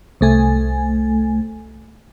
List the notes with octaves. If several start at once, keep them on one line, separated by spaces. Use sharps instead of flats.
C2 A3 G#5